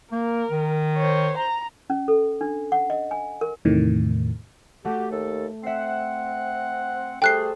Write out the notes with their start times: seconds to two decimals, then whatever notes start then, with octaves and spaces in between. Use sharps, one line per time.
0.12 A#3 A#4
0.51 D#3
0.97 C5 C#5
1.38 A#5
1.90 C#4
2.08 A4
2.41 D4
2.72 F#5
2.90 D#5
3.11 G#5
3.41 A#4
3.65 E2 A2 C3 D#3
4.85 A3 F#4 G4
5.11 D#2 A4
5.63 C4 E5 F#5 C7
7.22 G3 A3 G#4 A4 C5 G5 F#6 C7